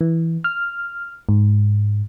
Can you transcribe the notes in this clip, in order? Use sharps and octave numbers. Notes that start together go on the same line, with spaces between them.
E3
F6
G#2